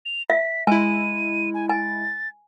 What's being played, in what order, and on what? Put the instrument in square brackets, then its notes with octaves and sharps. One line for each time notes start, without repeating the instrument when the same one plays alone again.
[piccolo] F7
[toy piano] E5 [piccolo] B6
[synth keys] G#3 E4 [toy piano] G#5 [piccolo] D#7
[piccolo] G#5
[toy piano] G#5 [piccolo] A6